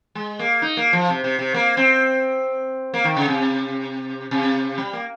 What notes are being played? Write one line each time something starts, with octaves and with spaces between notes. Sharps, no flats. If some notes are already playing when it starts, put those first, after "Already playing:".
G#3
A#3
D#4
A#3
F3
C3
C3
C3
A#3
C4
A#3
D#3
C#3
C3
C3
G3
A#3